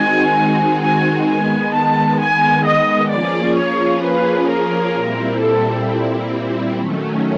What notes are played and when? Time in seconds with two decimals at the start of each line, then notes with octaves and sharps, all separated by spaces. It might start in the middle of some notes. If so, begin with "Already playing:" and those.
Already playing: D#3 G#3 C4 D#4 F#4 G#5
0.83 G#5
1.29 D#3 G#3 B3 G#5
1.74 A5
2.20 G#5
2.66 D#5
3.11 F3 A#3 C#4 F4 G#4 D5
3.57 C#5
4.03 B4
4.49 A#4
4.94 A#2 G3 C4 E4
5.40 A4
6.77 D#3 F#3 A3 C#4